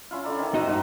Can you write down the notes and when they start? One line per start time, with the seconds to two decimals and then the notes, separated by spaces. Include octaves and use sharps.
0.11 C#4 E4 F4
0.24 D3 D5 A#5
0.39 D#3 C4
0.54 A#3 D#4 F#4 C5 D#5 E5
0.67 G2 D#4 F#4 F5